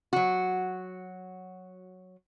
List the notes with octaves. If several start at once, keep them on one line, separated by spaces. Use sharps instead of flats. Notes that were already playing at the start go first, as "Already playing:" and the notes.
F#3 F#4